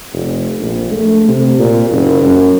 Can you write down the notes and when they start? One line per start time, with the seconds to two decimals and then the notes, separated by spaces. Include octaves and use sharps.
0.12 F1
0.60 A#1
0.91 A3
1.28 C3
1.58 A#2
1.90 F#1
2.22 F#2